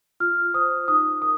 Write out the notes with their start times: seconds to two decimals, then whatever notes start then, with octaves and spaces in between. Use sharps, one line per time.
0.20 F4 F6
0.54 C5 D#6
0.88 D#4 D#6
1.22 A#4 D#6